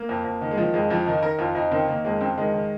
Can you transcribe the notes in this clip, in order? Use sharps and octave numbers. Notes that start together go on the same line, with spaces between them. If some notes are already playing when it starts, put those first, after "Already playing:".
Already playing: A#3
F2
F2
D#3
G#3
D#3 F3
F2 G#3
F2 F3
D#3 D#4
D#3 A#4
F2 F4
F2 D#4
D#3 C4
D#3 A#3
F2 G#3
F2 C4
D#3 G#3
D#3